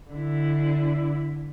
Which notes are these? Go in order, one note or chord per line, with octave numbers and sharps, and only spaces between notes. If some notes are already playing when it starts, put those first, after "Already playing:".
D3 E4